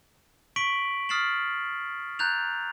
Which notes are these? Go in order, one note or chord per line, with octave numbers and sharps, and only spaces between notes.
C#6 B6 D7 F#7
D#6 F6 A6 C7 E7 F#7
A#5 F#6 G6 A6 F7